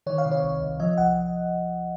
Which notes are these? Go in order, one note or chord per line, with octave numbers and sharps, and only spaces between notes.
D#3 C#5
F5
C3
C#5
C2
C2
F3 D#5
C2 F#5